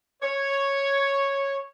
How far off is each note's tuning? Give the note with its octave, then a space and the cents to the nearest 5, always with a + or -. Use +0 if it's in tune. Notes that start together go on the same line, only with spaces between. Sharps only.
C#5 -5